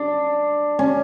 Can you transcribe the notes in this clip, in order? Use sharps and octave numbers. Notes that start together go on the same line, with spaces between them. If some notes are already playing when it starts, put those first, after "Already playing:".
Already playing: D4
C#4